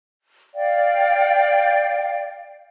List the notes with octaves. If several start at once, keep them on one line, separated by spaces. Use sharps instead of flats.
D5 F5 G5